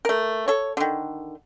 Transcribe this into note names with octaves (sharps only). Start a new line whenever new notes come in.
A3 A#4
A4 C#5
D3 D#3